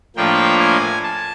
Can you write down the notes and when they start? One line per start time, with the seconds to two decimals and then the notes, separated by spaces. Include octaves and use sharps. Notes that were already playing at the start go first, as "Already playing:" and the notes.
0.16 A2 F3 A#3 D4 F4 G5
0.59 G#5
1.03 A5